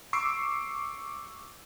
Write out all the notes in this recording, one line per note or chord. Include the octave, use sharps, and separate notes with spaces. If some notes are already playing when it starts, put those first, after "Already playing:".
C#6 D6 E6 C7 D7